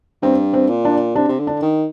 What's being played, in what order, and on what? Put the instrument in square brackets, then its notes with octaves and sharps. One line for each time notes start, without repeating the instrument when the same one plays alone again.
[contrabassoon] G2 [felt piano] C4
[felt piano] C4
[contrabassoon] A#2
[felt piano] D4
[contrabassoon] C3 [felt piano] D4
[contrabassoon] C3
D3
[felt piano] D4
[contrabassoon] D#3